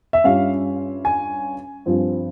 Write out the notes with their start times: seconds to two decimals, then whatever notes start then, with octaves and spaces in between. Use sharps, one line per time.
0.13 E5
0.24 G2 G3 C#4 F4 F5
1.05 G#5
1.85 G2 F3 C4 F4